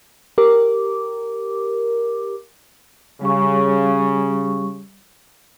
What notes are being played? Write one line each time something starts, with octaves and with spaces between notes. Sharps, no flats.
G4 A#4 D6
C#3 G3 G4 C#6